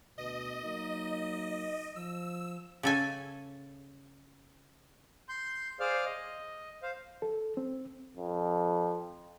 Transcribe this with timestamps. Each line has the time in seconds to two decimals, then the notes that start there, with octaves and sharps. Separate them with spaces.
0.18 D2 B2 D#5
0.64 F#3 A#3 D#4
1.96 F3 E6
2.83 C#3 A4 G#5
5.29 C6 G6
5.80 G#4 C5 D5 F5 F6
6.05 D#5
6.83 C5 F5
7.22 A4
7.57 C4
8.17 F2